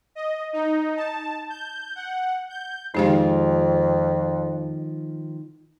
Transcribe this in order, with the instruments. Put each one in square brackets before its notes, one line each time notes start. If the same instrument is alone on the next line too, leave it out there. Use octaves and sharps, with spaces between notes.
[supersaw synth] D#5
D#4
A5
G6
F#5
G6
[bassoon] F2 [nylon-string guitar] D#3 F3 G#3 [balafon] D#4 G4 F5